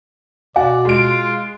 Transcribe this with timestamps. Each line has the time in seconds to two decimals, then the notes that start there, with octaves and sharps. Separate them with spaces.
0.56 B2 F#4 D5 F5 G#5
0.85 G#3 F4 D7